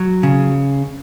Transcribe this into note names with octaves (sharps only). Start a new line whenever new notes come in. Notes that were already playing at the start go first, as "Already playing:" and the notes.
Already playing: F#3
C#3